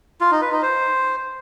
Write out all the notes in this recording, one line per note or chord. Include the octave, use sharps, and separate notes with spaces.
F4
D#4
B4
D#4
C5